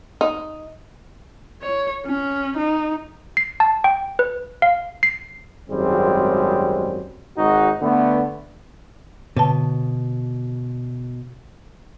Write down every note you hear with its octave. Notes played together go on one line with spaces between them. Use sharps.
D#4
C#5
C#4
D#4
C7
A5
G5
B4
F5
C7
G#1 F#2 G3 G#3 C4
G#1 G#3 D#4 F#4
D3 A3 B3
B2 D3 B4 A5